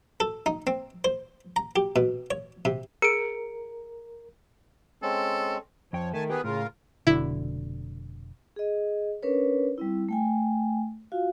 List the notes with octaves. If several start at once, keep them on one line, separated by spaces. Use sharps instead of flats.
A4
D#4
C4
C5
A#5
G4
B2
C#5
C3
G#4 A#4 C#7 D7
G#3 C4 C#4 A4
F2 F3 C#5 G5
D#3 A3 G#5 A5
B3 G4 G#4 B4
A2 C#3 F4 A#4
F1 B2 D3 E4
G#4 D#5
C#4 D4 A#4 B4 C#5
G3 C4 E4
A3 G5 G#5
F4 F#4 F5